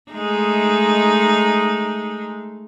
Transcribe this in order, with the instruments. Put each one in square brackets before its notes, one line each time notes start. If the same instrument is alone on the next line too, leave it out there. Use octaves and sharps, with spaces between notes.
[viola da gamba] G#3 A3 D#4